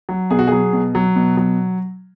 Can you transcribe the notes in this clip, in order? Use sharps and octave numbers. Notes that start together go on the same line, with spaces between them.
F#3
B2 G#4
F#4
F#3 G#4
B2
F#3
B2
F#3